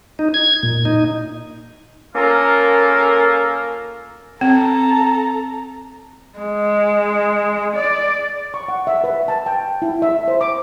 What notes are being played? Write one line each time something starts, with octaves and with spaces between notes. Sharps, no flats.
D#4
G#6
A#2
D#4
A#3 C#4 F4 A4 A#4
C4 A4 A#5
G#3
D5
C#6
F#5
E5
B4
A5
G5
E4
E5
C5
D6